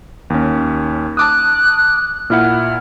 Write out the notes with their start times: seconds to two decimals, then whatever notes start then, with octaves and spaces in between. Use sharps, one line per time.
0.30 D#2 C#4
1.17 A5 D6 D#6 F#6
2.30 A#2 E4 F#5 F6